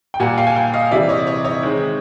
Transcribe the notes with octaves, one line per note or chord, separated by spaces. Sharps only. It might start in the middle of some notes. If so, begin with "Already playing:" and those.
G5
A#2 G3 A#3 F#5 G#5
F5 G5
G#5
F5 G5
D#5 F5
C3 E3 G3 D5 E5
C#5 D#5
C#5 D#5
C#5 D#5
D#3 G#3 C4